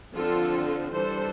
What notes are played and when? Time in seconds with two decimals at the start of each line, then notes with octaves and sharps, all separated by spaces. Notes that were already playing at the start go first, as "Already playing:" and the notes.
0.15 D3 F3 C4 F4 A4
0.93 E3 G3 D4 A4 C5